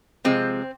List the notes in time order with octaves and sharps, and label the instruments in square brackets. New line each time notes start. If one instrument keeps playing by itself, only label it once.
[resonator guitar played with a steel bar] C3 F3 G#3 C4